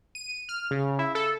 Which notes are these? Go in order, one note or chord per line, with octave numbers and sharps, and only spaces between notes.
D#7
F6
C#3
E4
A4